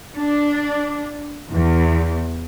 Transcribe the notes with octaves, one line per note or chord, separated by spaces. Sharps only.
D4
E2